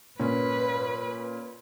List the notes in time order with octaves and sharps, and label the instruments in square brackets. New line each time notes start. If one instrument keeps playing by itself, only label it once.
[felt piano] A#2 C#4 [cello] B4